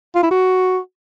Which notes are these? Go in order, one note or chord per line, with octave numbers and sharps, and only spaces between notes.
F4
E4
F#4